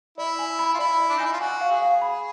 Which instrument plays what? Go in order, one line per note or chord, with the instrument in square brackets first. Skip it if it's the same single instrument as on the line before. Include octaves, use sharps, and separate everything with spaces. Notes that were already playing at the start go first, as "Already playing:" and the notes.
[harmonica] E4 [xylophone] D5
[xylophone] G#5
B5
[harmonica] F4
[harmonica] E4 [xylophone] D5
[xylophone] D5
[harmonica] D4
D#4
[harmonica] E4 [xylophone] G#5
[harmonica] F4
[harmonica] F#4 [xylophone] G#5
[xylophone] F5
[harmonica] G#4
[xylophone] F5
B5